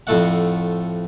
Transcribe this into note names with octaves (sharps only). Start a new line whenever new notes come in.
F2 A2 A3 F#5